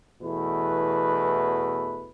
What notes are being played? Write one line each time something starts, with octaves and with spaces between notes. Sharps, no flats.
E2 B2 E3 A3 E4 B4